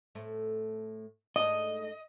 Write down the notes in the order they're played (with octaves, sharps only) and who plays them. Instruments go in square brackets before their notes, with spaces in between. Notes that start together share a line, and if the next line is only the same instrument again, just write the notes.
[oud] A2 A3 C4
[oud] G#2 A3 D4 [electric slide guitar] D#5